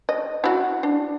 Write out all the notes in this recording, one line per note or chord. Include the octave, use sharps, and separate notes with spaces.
D#5
E4 F#4
D4